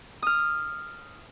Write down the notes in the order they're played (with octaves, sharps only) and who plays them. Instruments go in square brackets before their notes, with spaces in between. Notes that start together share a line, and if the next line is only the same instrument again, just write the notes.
[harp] D#6 F6